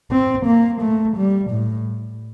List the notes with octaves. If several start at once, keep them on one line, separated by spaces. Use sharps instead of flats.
C4
A#3
A3
G3
A2